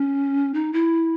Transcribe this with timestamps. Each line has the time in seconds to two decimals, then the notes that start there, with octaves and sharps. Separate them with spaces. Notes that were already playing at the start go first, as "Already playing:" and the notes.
Already playing: C#4
0.54 D#4
0.73 E4